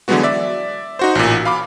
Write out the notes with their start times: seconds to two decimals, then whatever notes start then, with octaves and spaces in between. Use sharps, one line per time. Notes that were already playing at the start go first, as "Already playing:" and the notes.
0.08 D3 E3 F#3 G#3 B3 F#4
0.23 D5 E5
0.99 D#4 F#4 C5
1.15 A1 A#2
1.45 F5 B5 D6